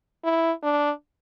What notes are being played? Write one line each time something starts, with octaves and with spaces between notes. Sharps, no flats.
E4
D4